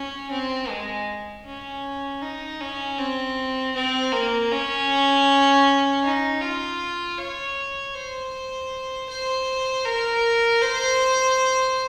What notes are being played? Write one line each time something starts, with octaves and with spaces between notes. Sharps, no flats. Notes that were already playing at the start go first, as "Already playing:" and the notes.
Already playing: C#4
C4
G#3
C#4
D#4
C#4
C4
C4
A#3
C#4
D#4
F4
C#5
C5
C5
A#4
C5